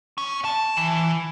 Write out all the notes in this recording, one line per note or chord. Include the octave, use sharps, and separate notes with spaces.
C#4
A5
E3